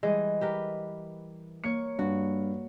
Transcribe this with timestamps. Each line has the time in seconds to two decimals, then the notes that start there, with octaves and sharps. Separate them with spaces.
0.03 E3 G3 G#3 D#5
0.41 G4 A#4 B4
1.64 A#3 C#5 C#7
1.99 G2 F#4